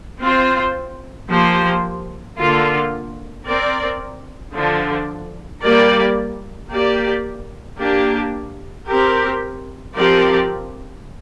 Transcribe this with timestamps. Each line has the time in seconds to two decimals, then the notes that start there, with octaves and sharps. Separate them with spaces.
0.20 C4 F4 C5
1.29 F3 A#3 G4 C5
2.37 D3 A#3 F4
3.45 C4 A#4 D5
4.54 D3 F3 D4
5.62 G3 A#3 G4 A#4 D5
6.71 A#3 G4 D5
7.80 A#3 D4 G4
8.88 C4 G4 A#4
9.96 F3 C4 G4 A#4 D5